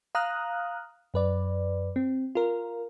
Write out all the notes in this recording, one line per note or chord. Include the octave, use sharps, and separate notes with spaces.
F5 A#5 D#6 F6 F#6
F#2 B4 D5
C4
F4 A#4